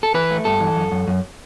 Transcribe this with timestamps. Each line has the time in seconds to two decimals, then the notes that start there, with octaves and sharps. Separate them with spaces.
0.03 A4
0.14 E3 B4
0.31 A3
0.45 G2 A4
0.60 E3
0.76 F#2
0.92 F#2
1.08 F#2